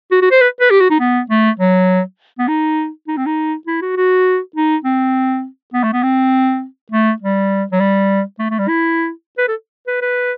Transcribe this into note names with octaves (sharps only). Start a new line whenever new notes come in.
F#4
F#4
C5
B4
B4
G4
F#4
D#4
B3
A3
F#3
B3
D#4
D#4
C4
D#4
E4
F#4
F#4
D#4
C4
B3
A3
B3
C4
A3
G3
F#3
G3
A3
A3
G3
E4
B4
A4
B4
B4